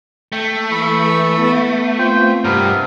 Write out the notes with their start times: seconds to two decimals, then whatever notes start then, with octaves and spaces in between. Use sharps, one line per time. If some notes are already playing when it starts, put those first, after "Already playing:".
0.32 A3 G5
0.72 E3 B5 C#6 E6
1.39 B3
1.99 B3 C4 F4 C5 G5
2.45 G2 C3 B3 A#4